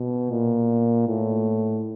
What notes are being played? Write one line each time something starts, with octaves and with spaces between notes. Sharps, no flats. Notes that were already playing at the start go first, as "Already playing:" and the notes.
Already playing: B2
A#2
A2